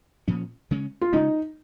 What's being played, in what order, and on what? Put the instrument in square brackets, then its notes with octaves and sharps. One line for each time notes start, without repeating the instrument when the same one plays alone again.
[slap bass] A#2 F3 A#3 C#4
C#3 G#3 C#4
[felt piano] F4
[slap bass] C#3 G#3 C#4 [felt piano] D#4